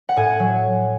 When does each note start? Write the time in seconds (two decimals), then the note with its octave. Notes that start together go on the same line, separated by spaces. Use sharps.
0.09 F#5
0.16 A2 G#5
0.40 F#3